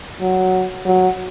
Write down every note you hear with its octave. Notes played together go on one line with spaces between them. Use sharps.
F#3
F#3